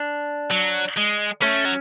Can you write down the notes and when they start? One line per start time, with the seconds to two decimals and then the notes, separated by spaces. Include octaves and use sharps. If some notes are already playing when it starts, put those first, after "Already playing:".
Already playing: D4
0.51 F#3
0.97 G#3
1.42 A3 C#4
1.65 F#3